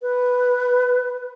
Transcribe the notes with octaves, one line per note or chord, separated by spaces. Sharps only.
B4